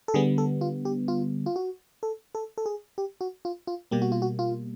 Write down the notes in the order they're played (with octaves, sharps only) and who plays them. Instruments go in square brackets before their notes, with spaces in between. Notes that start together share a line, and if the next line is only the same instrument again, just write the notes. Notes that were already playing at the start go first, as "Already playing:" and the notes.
[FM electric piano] A4
D3 G3 B3 G#4
A4
F4
G4
F4
F4
F#4
A4
A4
A4
G#4
G4
F#4
F4
F4
B2 G3 A#3 G4
F#4
F4
F#4
F4